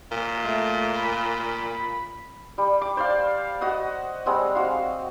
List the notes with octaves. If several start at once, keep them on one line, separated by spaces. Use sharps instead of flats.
A#2
A3
B5
G3
D6
C5 D5 F5
F#4 D#5 F#5
G3 G#3 C4 F#5
F#4 F5